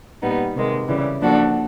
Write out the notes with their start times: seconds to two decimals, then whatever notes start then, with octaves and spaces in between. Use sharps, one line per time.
0.22 A#2 G3 B3 D#4
0.56 C3 D#3 G#3
0.88 C#3 E3 G3
1.21 F3 A#3 D4 F#4 A4